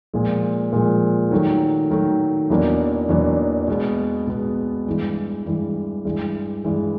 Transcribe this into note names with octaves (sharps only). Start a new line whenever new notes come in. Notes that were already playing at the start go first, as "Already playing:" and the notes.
A#2 F3 G#3
A#2 F3 G#3
D#3 F#3 A3
D#3 F#3 A3
E2 B2 F#3 A#3 D4
E2 B2 F#3 A#3 D4
B2 G#3 B3
B2 G#3 B3
G2 E3 G#3
G2 E3 G#3
G2 E3 G#3
G2 E3 G#3